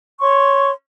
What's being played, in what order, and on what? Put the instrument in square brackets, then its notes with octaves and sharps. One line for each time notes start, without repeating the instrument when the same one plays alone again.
[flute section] C#5 C6 C#6